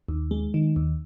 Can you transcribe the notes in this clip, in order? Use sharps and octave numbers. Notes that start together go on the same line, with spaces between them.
D#2
G#3
D#3
D#2